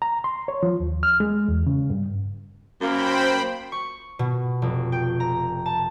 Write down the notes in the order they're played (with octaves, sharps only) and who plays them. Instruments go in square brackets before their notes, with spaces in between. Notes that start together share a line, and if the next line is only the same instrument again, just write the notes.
[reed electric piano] A#5
C6
C#5
F3
D#2
F6
G#3
E2
C#3
G2
[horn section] F#2 A#3 [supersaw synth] C5 G5 B5
[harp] C#6
B2
F1
G5
A#5
A5